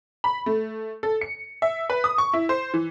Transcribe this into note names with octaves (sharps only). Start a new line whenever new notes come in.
B5
A3
A4
C#7
E5
B4
D#6
C#6
E4
C5
E3